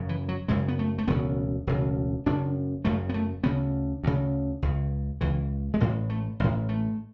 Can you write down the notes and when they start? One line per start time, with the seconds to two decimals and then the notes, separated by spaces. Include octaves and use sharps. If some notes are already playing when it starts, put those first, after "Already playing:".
Already playing: F#1 F#2 C#3
0.09 E3
0.29 F#3
0.48 F#1 F#2 C#3 G#3
0.68 B3
0.79 A3
0.98 A3
1.08 E1 D2 C#3 B3
1.67 E1 D2 C#3
2.26 F#1 F#2 C#3 D4
2.85 F#1 F#2 C#3 A3
3.09 B3
3.14 A3
3.44 D2 C#3 B3
4.04 D2 C#3
4.62 C#2 C#3
5.21 C#2 C#3 E3
5.74 G#3
5.80 A1 A2 F#3
6.10 A3
6.40 A1 A2
6.69 A3